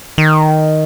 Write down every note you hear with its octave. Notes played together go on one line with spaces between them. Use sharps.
D#3